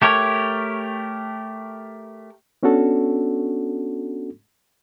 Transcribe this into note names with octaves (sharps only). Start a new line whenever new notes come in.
A3 G4 A#4 C#5
B3 C#4 D4 F#4 A4